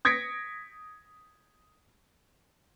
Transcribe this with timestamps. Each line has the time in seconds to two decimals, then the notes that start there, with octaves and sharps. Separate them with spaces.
0.05 D#6 G#6 A#6 B6 C#7 D7